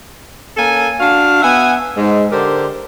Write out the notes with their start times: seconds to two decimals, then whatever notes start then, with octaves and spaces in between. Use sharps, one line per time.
0.57 A#3 C#4 A4 G#5
1.00 D4 F#4 F5
1.42 B3 E5 F#5 G#5
1.96 G#2
2.32 D3 G4 A#4 C5 D5